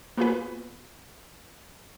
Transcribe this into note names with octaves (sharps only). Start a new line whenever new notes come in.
A#3 B3 F4 F#4 G#4 B4